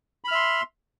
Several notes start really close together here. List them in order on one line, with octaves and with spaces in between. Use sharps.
B5 F6 E5 C6